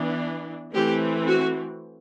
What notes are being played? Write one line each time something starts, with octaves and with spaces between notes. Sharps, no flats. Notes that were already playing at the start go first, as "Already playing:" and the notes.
Already playing: E3 B3 D4
E3 A3 C4 G4
F#4